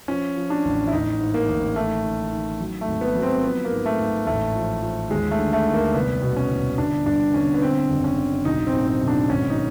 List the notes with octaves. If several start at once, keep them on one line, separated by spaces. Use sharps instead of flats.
F3 C#4
F3
D4
A1
E4
A1 D#4
G#2
A#3
A1
D#3 A3
D#3
D#3
F#3
A3
G#1
B3
F#3
C4
F3 B3
A#3
G#2
A3
G#2
A1 A3
F3
F3
D#2 G#3
A3
D3
A3
D#2
A#3
C2 B3
B2
C#4
C2
G1 D4
G2 D4
G1 C#4
B3
D3 C4
F#1
C#4
D3
B1 D#4
C4
A2
C4
B1
D4
G#1 C#4
D#4